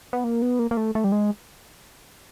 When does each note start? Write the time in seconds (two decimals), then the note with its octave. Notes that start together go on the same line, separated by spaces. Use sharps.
0.13 B3
0.24 A#3
0.42 B3
0.59 A#3
0.71 A#3
0.77 A3
0.95 A3
1.04 G3
1.12 G#3